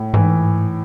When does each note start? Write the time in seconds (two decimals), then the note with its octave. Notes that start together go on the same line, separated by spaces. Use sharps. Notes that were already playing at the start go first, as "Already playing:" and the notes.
Already playing: A2
0.14 G#2 E3